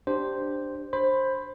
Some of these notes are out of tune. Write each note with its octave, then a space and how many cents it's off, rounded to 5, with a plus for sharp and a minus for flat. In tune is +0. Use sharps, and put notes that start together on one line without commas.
D4 +0 G4 +0 C5 +0
C5 +20 B5 +10